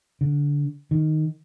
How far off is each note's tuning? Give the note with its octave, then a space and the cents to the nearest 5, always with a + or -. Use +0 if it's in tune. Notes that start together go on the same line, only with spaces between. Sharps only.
D3 -20
D#3 -5